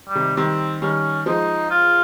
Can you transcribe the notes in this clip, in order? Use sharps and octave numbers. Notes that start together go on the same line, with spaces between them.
G3
C3 D#3
D#3 G3 C4
D#3 G3 C#4
F3 G#3 D#4
F4